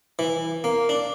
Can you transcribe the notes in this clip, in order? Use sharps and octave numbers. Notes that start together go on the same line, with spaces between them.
E3
A#3
D4